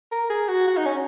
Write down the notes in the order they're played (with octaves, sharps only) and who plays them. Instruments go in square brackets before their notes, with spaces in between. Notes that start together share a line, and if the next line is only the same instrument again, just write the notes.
[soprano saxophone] A#4
G#4
F#4
F#4
D#4
C#4